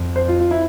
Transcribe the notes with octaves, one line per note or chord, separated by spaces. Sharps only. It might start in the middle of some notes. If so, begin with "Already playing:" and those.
Already playing: F2
C5
F4
F4
E4